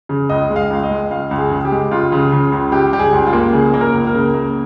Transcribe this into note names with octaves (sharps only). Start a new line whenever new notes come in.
C#3
C#2 D#5
G#3
F5
C#2
D#5
G#3
C#2 F5
C#2
G#4
C#3
G4
G#3
C#2 F4
C#3
C#3
C#2
C#2 G4
G3 G4
G#4
C#2
F4
A#3
C#3 G#4
A#3
A#4
C#2
A#4
C#3
A#3